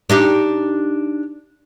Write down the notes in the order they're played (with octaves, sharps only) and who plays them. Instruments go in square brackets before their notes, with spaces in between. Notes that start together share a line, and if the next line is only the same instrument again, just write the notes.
[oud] D4 D#4 G4